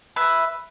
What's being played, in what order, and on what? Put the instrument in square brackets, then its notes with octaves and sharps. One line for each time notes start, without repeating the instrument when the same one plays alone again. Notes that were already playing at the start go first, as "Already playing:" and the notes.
[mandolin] B4 E5